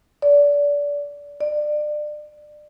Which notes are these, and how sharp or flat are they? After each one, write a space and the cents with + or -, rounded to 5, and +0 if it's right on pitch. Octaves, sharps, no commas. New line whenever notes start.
D5 -25
D5 +30